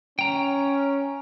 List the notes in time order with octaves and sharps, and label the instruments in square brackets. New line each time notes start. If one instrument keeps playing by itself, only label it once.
[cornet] C#4 [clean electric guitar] G5 A#5